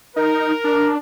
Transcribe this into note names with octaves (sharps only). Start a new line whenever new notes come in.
D#4 A#4
D4